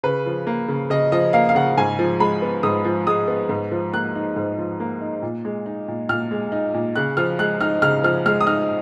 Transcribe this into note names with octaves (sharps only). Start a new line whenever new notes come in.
C#3 B4
F3
A#3
C#3
C#3 D#5
F3 D#5
A#3 F5
F5
C#3 F#5
G#2 G#5
F3
G#3 B5
B3
G#2 D#6
F3
G#3 D#6
B3
G#2
F3
A#3 F#6
D#4
G#2
F3
A#3
D#4
A#2
G#3
D#4
A#2
A#2 F6
G#3
D#4
A#2
C#3 F#6
F3 F6
G#3 F#6
D#4 F6
C#3 F6
F3 F6
G#3 F6
D#6
D#4 F6